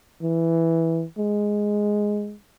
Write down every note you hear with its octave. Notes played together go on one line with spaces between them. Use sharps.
E3
G#3